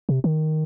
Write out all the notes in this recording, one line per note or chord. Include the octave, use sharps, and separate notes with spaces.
C3
D#3